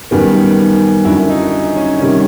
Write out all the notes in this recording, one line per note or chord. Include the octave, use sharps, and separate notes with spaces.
F#2 D#3 G3 B3
F#2 D3 F#3 E4
D#4
C#4
C3 D#3 G3 C#4